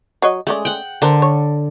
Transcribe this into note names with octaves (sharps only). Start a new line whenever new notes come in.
F#3 C#5 D#5
G#3 A3 C#4 D5
F#5 G5
D3 D4 A#4 C5
C#5